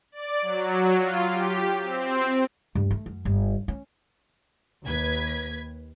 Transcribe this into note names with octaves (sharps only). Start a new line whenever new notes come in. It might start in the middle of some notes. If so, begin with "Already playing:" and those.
D5
F#3
F4
G4
C4
G2
A3
F#2
G1
C#4
D#2 B4 G#6 B6